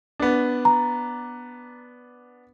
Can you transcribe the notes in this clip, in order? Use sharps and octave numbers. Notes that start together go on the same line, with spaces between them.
B3 D4
A#5